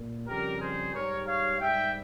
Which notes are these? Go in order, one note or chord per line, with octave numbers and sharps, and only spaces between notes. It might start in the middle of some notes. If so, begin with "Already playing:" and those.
Already playing: A#2
F2 C#3 G3 G4 A#4
G#4 C5
G#2 G3 A#4 C#5
C#5 F5
G#2 G3 E5 G5